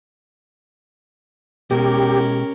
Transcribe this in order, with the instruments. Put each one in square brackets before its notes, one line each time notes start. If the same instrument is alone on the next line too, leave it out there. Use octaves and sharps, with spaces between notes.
[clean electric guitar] B2 G#3 [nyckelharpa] C#4 A#4 [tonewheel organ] G4